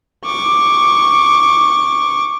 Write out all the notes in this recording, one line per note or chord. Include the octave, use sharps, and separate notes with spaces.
C#6 D6